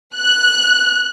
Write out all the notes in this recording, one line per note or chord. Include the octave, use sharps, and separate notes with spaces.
F#6